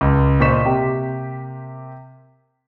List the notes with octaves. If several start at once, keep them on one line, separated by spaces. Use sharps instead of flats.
C#2
A#2 C5 D#5 C#6 B6 E7
C3 A#3 G4